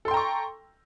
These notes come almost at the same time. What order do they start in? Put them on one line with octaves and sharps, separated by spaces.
A4 C6 G5 A#5 C#6